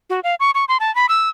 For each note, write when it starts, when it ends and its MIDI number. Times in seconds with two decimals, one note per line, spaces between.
0.10 0.20 66
0.24 0.35 77
0.40 0.51 85
0.55 0.65 85
0.68 0.77 84
0.80 0.93 81
0.95 1.06 83
1.09 1.29 88